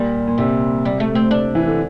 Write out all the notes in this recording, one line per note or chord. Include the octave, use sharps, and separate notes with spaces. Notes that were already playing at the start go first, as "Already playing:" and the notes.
Already playing: A#2 G3
A#2
C3 G3
G3
A3
C4
D4
E3
D3